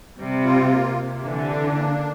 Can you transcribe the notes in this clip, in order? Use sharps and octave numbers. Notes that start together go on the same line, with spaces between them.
C3 G3
F4
A#3
C3
D3 E3
D4
A#3